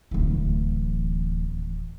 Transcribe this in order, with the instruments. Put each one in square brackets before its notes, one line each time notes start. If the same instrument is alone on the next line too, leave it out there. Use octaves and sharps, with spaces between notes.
[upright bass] D1 E3